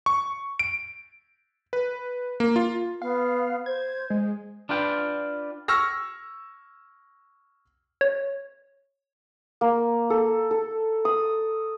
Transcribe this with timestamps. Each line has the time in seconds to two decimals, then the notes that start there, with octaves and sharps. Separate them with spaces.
0.06 C#6
0.59 D7
1.73 B4
2.40 A#3
2.56 F4
3.02 B3 F5
3.66 C5 G#6
4.10 G#3
4.69 D4 F4 B4 G5
5.68 C#6 E6 F6 A#6
8.01 C#5
9.61 A#3
10.10 A4
10.51 A4
11.05 D#6